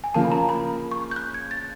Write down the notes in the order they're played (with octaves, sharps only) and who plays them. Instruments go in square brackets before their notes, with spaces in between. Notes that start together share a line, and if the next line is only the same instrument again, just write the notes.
[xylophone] G#5
[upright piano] C#3 F3 A#3 [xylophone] A5
[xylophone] B5
A#5
B5
C#6
G6
F#6
G#6
A6